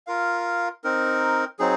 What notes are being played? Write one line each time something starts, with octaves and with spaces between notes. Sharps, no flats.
F4 A#4 F5
C4 D#4 A#4
F#3 C4 D#4 G#4